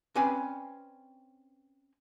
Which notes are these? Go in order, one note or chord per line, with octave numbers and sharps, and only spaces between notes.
C4 C#4 B4 D5 G#5 B5